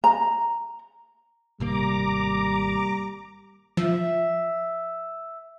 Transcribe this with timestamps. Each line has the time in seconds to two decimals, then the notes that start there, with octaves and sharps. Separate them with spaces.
0.04 A#5
1.60 G#1 C3 G3 A#3 A#5 D6
3.77 F3 E5